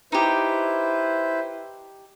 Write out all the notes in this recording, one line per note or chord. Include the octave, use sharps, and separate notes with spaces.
D#4 E4 G4 B4 C5